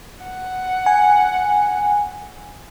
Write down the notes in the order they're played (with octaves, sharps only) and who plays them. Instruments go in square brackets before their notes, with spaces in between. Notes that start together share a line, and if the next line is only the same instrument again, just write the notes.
[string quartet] F#5
[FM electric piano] G#5